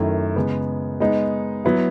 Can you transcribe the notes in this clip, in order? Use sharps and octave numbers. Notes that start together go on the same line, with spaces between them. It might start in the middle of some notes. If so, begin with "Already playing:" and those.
Already playing: F#2 D#3 A3 E4
C#3 G#3 B3
G#3 B3 D#4
F#3 B3 E4